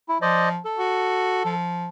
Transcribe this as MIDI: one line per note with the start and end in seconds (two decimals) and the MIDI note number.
0.09 0.18 64
0.22 0.58 53
0.22 0.49 72
0.22 0.49 74
0.22 0.49 75
0.65 1.54 69
0.78 1.43 66
1.45 1.89 53